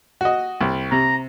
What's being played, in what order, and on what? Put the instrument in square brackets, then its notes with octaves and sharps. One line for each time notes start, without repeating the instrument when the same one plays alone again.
[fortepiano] F#4 D#5
C2
[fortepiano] C3 [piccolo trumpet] A#5